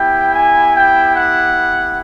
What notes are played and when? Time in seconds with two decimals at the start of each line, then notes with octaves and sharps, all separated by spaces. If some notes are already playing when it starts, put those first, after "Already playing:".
Already playing: B3 E4 G4 G5
0.34 G#5
0.75 G5
1.15 F#5